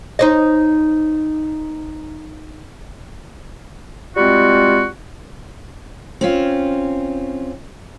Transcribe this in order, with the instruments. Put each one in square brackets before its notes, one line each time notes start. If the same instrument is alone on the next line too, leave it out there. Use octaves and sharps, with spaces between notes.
[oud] D#4 C5 D#5
[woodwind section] G3 G#3 C4 F4 F#4
[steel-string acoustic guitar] C4 C#4 F4